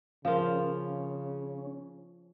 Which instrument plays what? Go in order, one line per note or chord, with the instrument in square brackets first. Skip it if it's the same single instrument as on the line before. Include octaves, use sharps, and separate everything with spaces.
[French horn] C#3 [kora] F3 F4 [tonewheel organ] C#4 [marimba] A#4 F5